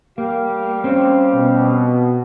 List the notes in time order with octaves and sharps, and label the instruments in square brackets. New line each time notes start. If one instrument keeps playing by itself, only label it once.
[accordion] G3 G4 F5 [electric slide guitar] A#3
[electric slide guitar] C4 C#4
[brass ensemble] B2